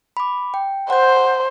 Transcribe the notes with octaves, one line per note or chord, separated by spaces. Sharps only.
B5 D6
G5
C5 F#5 G6